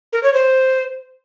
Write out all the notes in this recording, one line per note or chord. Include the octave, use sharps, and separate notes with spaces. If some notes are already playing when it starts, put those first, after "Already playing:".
A#4
C#5
C5